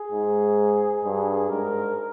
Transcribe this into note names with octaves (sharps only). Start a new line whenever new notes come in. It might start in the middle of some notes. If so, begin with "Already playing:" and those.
Already playing: G#4
G#2
G2
G#2 A#4